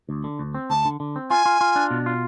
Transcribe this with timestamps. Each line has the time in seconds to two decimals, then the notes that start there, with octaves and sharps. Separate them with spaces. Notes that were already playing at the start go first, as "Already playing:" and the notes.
0.09 D2
0.24 D3
0.39 D2
0.54 C4
0.70 D2 A5
0.85 D3
1.00 D3
1.16 C4
1.30 F4 G#5
1.46 F4
1.61 F4
1.76 D4
1.91 B2
2.06 F4